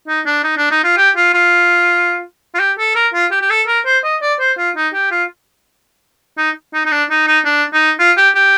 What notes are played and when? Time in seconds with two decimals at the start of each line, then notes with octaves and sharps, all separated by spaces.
0.08 D#4
0.26 D4
0.44 D#4
0.58 D4
0.71 D#4
0.84 F4
0.98 G4
1.16 F4
1.34 F4
2.55 F4
2.59 G4
2.78 A4
2.95 A#4
3.14 F4
3.31 G4
3.42 G4
3.50 A4
3.67 A#4
3.86 C5
4.04 D#5
4.22 D5
4.40 C5
4.58 F4
4.76 D#4
4.94 G4
5.11 F4
6.38 D#4
6.74 D#4
6.86 D#4
6.92 D4
7.10 D#4
7.27 D#4
7.45 D4
7.73 D#4
7.99 F4
8.17 G4
8.36 G4